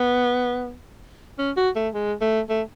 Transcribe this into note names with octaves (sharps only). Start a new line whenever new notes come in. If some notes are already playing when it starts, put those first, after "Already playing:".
Already playing: B3
C#4
F#4
A3
G#3
A3
A3